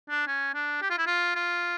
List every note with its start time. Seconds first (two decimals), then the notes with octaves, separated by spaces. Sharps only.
0.10 D4
0.28 C#4
0.54 D4
0.82 G4
0.90 F4
0.98 E4
1.07 F4
1.35 F4